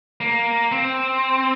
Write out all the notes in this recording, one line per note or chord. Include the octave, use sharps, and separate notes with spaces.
A#3
C4